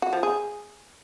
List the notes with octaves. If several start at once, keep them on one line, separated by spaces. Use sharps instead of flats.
F#4
F3
G#4